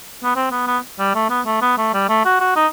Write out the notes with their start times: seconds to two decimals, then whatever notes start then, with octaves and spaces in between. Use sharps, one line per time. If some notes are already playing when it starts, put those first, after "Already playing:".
0.24 B3
0.36 C4
0.51 B3
0.67 B3
0.99 G3
1.15 A3
1.30 B3
1.46 A3
1.62 B3
1.78 A3
1.94 G3
2.09 A3
2.25 F#4
2.40 F#4
2.56 D#4